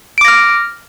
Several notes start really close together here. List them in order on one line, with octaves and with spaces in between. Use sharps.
D7 D6 A#6 F6